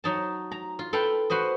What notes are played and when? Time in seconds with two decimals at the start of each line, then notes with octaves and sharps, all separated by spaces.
0.04 F#3 D#4 A5
0.52 A#5
0.79 F4
0.93 A4 B4 F5 G5
1.30 F#4 B4 C5 D#5